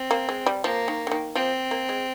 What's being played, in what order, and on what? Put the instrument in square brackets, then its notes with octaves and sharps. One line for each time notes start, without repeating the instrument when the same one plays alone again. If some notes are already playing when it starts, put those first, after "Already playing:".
Already playing: [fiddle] C4
[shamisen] A#3
G#3
G3
[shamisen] F3 [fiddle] A#3
[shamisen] D#3
D3
D#3
[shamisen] F3 [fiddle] C4
[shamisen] A#3
G#3